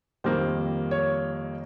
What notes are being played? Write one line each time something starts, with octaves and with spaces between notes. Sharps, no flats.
F2 D#3 G3 A#3 C5
C#5